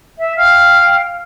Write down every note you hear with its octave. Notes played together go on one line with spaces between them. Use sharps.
E5
F5 G5 F6